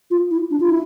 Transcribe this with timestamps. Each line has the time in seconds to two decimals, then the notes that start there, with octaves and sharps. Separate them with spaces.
0.11 F4
0.31 E4
0.51 D4
0.60 F4
0.70 E4